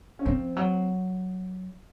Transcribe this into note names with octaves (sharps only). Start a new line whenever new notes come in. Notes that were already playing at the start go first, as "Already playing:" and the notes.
C#4
F3 C4
F#3